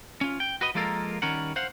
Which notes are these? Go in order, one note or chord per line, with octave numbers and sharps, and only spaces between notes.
C#4 F4
G5
F#4 B4 D#5
F3 G#3 A#3 F4 A4 A#4
D#3 G3 C#4 A#4 F#5
C5 F5 F#5